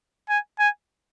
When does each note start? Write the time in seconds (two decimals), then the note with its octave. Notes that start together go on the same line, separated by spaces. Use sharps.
0.29 G#5
0.59 G#5